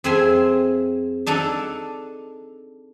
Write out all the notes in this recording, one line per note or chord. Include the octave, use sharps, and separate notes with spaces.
F2 C4 G#4 E5 G#5 C6
D4 D#4 A4 F#5